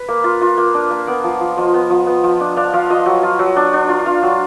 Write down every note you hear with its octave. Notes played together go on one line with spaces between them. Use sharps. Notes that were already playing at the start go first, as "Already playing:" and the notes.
Already playing: B4
A#3
F4
F4
A#3
D4
A#3
B3 D5
F3
F3
F3 D#5
B3
F3
B3
F3
D4
D4 F5
F3 F5
F3 D#5
F#3
F4
F#3
D4
D4
F4
F4 F5
F#3